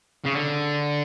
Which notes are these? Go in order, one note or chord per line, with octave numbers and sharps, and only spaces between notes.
C#3
D3